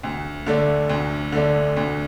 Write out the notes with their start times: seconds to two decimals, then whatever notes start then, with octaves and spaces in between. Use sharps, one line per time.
0.03 D2
0.46 D3 A3 D4
0.89 D2
1.32 D3 A3 D4
1.77 D2